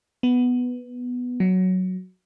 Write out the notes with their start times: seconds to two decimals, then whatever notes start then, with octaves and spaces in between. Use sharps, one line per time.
0.23 B3
1.40 F#3